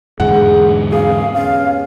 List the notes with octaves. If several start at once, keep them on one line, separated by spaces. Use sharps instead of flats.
E2 G#2 D3 G#4 F#5
C3 G#4 F5
C3 B3 C#4 F5